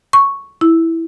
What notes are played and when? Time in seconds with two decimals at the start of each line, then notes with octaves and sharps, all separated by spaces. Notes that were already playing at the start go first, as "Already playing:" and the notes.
0.13 C#6
0.61 E4